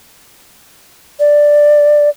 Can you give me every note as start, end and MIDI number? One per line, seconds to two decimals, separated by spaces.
1.20 2.09 74